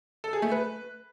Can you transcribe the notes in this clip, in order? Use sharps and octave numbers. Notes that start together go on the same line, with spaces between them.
A4
G#4
A3
B4